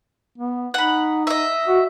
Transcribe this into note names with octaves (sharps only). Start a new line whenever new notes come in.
B3
D#4 F#5 B5
D#5 E5
F#4